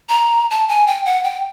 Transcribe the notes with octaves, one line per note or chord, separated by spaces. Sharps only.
A#5
A5
G#5
G5
F#5
G5